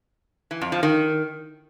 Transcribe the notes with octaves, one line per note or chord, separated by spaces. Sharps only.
E3
F2
F3
D#3